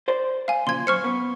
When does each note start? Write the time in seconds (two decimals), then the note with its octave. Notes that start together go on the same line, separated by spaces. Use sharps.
0.08 C5 D5 C6
0.48 F5 G#5
0.67 A#2 C#3 F3 C6 G#6
0.87 F#2 C5 C#6 F6 C#7
1.04 B3